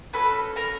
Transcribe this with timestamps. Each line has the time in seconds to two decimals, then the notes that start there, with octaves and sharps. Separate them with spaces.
0.13 C#4 F#4 A4 B4 B5
0.56 A#4 A#5